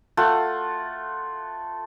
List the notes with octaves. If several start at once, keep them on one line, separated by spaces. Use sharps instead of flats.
A3 F4 F#5